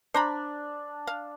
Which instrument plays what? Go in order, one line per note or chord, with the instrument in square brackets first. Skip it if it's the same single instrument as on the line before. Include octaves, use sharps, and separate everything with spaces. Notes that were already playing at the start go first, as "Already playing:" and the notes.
[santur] D4 [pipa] C5 A#5 B5
[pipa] F5